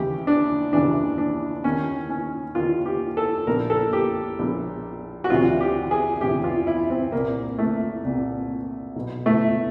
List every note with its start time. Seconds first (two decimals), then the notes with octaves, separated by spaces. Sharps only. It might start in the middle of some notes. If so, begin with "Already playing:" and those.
Already playing: D#2 C#3 E3 G4
0.27 D4
0.73 D#2 C#3 E3 D4
1.18 D4
1.64 D#2 D#3 C#4
2.10 C#4
2.55 D#2 D#3 F4
2.86 G4
3.17 A4
3.47 A#1 A#2 A#4
3.70 A4
3.93 G4
4.39 A#1 A#2
5.24 F#4
5.30 D2 C3 E3 F4
5.61 G4
5.91 G#4
6.21 D2 C3 E3 G4
6.44 F4
6.67 E4
6.90 C4
7.12 C2 A#2 A#3
7.59 A3
8.04 C2 A#2
8.96 B1 B2
9.26 A3